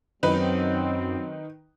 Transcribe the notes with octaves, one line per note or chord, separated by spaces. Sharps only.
F#2 D#3 F#3 C4 D#4 B4